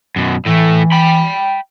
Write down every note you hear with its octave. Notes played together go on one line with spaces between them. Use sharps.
F#2 B2
A2 E3 A3
G5 B5